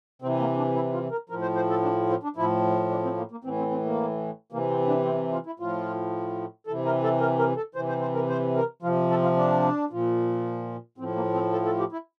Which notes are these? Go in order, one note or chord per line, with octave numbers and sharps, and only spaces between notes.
C3 E3 C4
A#3
D4
E4
F4
A#4
A2 F3 A#4
C5
C5
A4
D4
C4
D4
A2 F3 E4
D4
C4
A#3
A#3
A2 E3 C4
C4
C4
A#3
C3 E3 A#3
C4
D4
C4
F4
E4
A2 F3 F4
C3 E3 A4
A#4
A4
A#4
A#4
A4
C3 E3 C5
C5
C5
A#4
C5
A#4
C3 F3 F4
A4
F4
D4
A#2 F3
A2 F3 C4
A#3
C4
A4
A4
G4
E4